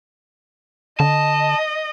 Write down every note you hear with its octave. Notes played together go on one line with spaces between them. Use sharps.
D3 D#5 A5